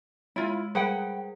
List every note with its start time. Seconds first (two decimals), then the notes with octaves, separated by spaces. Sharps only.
0.36 G#3 E4 F4
0.75 G3 G#4 A#4 B4 F#5 G5